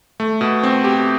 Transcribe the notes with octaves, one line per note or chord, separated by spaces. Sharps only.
A3
B2
C4
G4